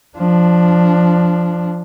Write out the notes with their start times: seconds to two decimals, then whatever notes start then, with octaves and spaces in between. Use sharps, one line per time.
0.18 F3 D4